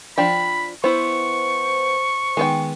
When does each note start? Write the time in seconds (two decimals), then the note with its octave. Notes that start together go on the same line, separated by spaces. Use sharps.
0.18 F3 D4 G5 B5
0.84 B3 E4 C5 C#6
2.37 D#3 G#3 B3 G5